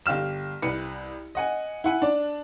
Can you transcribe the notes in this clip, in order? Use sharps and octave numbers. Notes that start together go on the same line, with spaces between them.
G1 G4 F5 F6 E7
C2 B4 C#7
D#5 F#5 G#5
E4 F#5 G#5
D4 D5